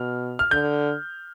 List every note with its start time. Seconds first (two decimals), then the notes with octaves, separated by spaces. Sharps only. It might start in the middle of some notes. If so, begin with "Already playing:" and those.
Already playing: B2 F6
0.39 F6
0.51 D3 G6